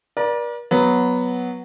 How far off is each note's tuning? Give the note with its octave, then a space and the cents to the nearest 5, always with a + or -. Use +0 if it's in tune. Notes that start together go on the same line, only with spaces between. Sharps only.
A#4 +45 D5 +0
F#3 +0 B3 +0